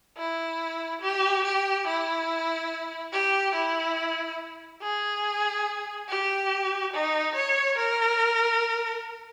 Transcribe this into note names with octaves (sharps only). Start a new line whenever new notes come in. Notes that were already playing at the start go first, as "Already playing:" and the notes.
E4
G4
G4
E4
G4
E4
G#4
G4
D#4
C#5
A#4